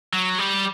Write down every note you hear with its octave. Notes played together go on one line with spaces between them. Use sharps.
F#3
G3